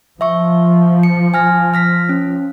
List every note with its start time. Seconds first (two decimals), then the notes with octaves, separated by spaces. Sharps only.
0.21 F3 E5 C#6
1.03 C#7
1.34 G#5 F6 A#6
1.74 F6 A#6 B6
2.09 C#4